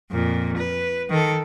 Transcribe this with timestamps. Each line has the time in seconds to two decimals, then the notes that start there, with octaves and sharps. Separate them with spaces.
0.12 F2 A#2
0.57 B4
1.10 D#3 A4